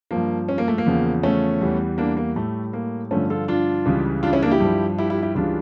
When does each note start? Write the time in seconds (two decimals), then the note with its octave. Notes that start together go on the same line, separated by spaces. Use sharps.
0.11 G2 F3 A#3
0.49 C#4
0.58 A#3
0.68 A3
0.78 A#3
0.86 E2 C#3 F3
1.23 A3 C#4
1.61 E2 E3 G3
1.98 A#3 D4
2.17 A#3
2.36 A2 G3 A3
2.73 A#3
3.11 G2 D3 F3 A3 C#4
3.30 F4 A4
3.48 D4 F4
3.86 C#2 C#3 E3 G3
4.23 D4 F4
4.33 C#4 E4
4.43 A#3 D4
4.51 E4 G4
4.60 G2 F3
4.99 E4 G4
5.10 E4 G4
5.23 E4 G4
5.35 C#2 C#3 E3 G3 D4 F4